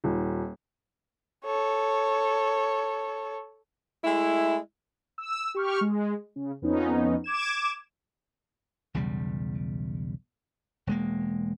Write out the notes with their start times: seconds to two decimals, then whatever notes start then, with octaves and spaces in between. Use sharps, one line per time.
0.04 D#1
1.44 A4 C#5
4.04 G#3 A3 E4
5.18 E6
5.55 G4 C#6 F6
5.81 G#3
6.36 C#3
6.62 F2 B3 C#4 D#4
7.24 D6 G#6 E7
8.94 B1 E2 C#3 G3
10.87 E1 G#3 A#3